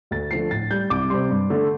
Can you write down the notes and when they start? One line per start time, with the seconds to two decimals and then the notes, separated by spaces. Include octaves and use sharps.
0.11 D2 A6
0.31 D3 F3 A3 C7
0.51 A2 A6
0.71 G3 G6
0.90 C2 D6
1.10 C3 G3 C6
1.30 G2
1.50 D3 A3